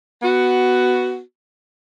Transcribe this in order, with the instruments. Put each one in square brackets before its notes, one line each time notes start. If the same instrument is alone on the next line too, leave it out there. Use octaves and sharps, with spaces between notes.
[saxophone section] B3 F#4